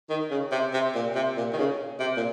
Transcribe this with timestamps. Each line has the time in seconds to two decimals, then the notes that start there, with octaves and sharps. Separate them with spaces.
0.10 D#3
0.31 C#3
0.52 C3
0.73 C3
0.95 A#2
1.15 C3
1.37 A#2
1.53 D#3
1.58 C#3
2.00 C3
2.17 A#2